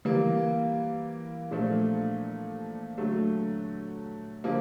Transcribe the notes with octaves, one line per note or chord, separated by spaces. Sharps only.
E3 G3 A#3
A#2 F3 A3 D4
D3 F#3 A3
D3 F3 A#3